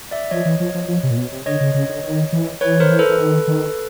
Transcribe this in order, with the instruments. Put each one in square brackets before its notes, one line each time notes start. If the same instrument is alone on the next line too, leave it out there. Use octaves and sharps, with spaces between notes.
[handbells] D5 E5
[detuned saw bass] F3 [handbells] C#5 D#5
[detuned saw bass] E3
F3
F3
F3
C3
A#2
B2
C3
[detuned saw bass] D3 [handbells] C#5 D#5
[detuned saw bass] C#3
C#3
D3
D#3
E3
[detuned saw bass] E3 [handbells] B4 C#5
[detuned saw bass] D#3 [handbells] A#4 C5
[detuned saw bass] E3
[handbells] A4 B4
[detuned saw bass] E3
D#3
D#3